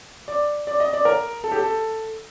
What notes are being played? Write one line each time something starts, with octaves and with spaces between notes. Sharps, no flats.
D5
D5
D#5
D5
A#4
A4
G4
A4